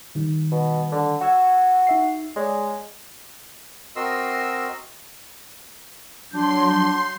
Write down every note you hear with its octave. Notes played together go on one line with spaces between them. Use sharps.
D#3 G3
B2
D3
F#4 C#6 E6 G#6
D#4 E5 C7
G#3 C#5 D5
C4 F#4 A#4 D#5 C6 E6
F#3 D4 C6 G6